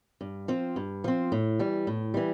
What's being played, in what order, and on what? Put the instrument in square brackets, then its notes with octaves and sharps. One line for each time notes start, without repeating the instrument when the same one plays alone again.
[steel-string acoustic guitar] G2
F3 C4
G2
F3 C4
A2
E3 G3
A2
E3 G3